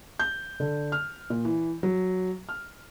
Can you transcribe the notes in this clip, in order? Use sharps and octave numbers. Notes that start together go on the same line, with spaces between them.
G6
D3
F6
A#2
E3
F#3
F6